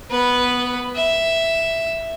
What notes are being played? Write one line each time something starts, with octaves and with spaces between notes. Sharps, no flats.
B3 B4
E5